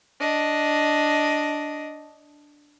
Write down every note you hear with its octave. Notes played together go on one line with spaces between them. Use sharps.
D4 D#5